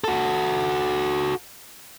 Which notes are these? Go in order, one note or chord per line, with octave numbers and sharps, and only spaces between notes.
F#4 A4